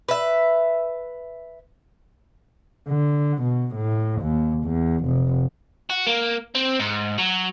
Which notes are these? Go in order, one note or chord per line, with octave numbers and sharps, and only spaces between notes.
B4 E5
D3
B2
A2
D#2
E2
F1
F#4
A#3
C4
G#2
F#3